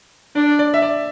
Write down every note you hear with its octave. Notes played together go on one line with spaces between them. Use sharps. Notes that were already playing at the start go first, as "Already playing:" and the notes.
D4 D5
D5
E5
D5